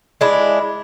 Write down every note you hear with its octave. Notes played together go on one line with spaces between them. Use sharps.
G#3 D4 E4